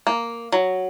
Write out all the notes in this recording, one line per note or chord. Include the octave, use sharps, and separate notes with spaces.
A#3
F#3